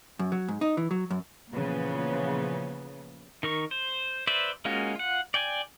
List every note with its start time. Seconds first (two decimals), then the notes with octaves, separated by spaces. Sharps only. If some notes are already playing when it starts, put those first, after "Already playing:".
0.19 F#2
0.32 F#3
0.48 G#2
0.61 D#4
0.77 E3
0.91 F#3
1.10 F#2
1.52 A#2 C#3 E3 F3 B3
3.43 D#3 A#4 C#6
3.71 C5
4.27 B4 C5 D5 E5
4.65 G#3 A#3 C#4 F4 F#4
4.95 F4 F#5
5.34 D5 G5 G#5